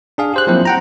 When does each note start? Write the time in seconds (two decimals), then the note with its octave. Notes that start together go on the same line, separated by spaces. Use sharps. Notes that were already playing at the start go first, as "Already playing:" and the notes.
0.18 D4 G#4 F5
0.34 G4 C5 F#6
0.47 F3 F#3 A#3 C4 E4 C5
0.65 F#5 G5 A#5